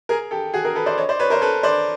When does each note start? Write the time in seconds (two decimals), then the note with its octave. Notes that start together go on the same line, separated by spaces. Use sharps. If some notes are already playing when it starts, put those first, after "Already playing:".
0.09 G#4 A#4
0.31 G4 A4
0.53 F#4 G#4
0.64 G#4 A#4
0.75 A4 B4
0.86 C5 D5
0.98 C#5 D#5
1.09 C5 D5
1.19 B4 C#5
1.30 A#4 C5
1.42 A4 B4
1.63 C5 D5